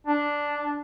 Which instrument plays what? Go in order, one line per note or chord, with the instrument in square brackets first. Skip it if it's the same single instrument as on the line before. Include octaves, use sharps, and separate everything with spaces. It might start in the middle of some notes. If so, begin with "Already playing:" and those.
[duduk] D4